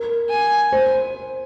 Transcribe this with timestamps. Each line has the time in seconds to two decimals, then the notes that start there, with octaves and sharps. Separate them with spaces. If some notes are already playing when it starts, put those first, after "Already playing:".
Already playing: A#4
0.31 G#5
0.72 C5